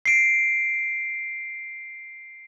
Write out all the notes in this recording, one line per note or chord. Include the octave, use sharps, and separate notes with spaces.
C7 D7